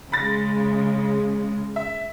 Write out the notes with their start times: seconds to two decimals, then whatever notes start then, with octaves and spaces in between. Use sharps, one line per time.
0.12 C#3 G#3 B5 A6 A#6
1.76 E5